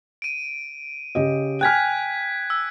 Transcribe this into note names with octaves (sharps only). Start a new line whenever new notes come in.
D7 D#7
C#3 G4 D#5
G5 G#5 F6 F#6 G#6 B6
E6